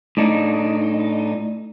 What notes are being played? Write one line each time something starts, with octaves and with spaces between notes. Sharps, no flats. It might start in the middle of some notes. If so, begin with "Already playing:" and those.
A2 D4 D#4